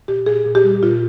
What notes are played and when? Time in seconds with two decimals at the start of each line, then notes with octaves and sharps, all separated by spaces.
0.08 A#2 G4
0.26 A#2 G#4
0.46 A#2
0.55 G4
0.64 G3
0.83 A#2 F4